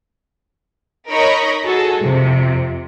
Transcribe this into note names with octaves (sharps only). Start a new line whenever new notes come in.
D#4 A#4 C#5 D#5 B5 C#6
F#4 G#4 A4
F2 C3